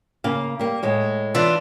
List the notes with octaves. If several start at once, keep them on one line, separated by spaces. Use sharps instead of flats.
C#3 A#3 F5
G3 A#3
A2 G#3
E3 D4 F4